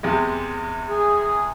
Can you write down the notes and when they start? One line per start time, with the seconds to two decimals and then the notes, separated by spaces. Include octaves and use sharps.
0.03 E2 C3 G#3
0.89 G#4